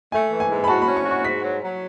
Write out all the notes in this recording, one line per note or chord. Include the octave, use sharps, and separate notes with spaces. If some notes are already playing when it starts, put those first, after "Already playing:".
A3 G#5
E3
G#5
G#2
B5
F#4 A5
B5
C#4
C#6
F#4
C#6
G#2 B6
F#3
F#3